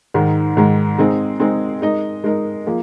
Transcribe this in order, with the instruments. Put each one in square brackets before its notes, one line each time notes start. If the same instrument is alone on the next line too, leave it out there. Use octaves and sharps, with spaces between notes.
[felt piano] G#2 D#3 G#3
G#2 D#3 G#3
G#3 C4 D#4 G#4
G#3 C4 D#4 G#4
G#3 D#4 A#4 D#5
G#3 D#4 A#4 D#5
F3 A#3 G#4